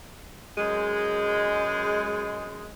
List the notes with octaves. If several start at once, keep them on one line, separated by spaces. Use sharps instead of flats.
F#2 G#3